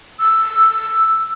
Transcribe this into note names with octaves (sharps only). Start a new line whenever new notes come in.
E6